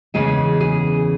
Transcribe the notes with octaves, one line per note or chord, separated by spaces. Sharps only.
E2 C#3 E3 G#3 G#4
G#4